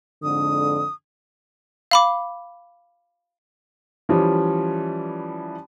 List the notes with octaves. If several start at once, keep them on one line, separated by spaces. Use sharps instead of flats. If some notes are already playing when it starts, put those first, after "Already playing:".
F2 G#2 D3 D#6
F5 B5 D6
E3 F3 G3 C#4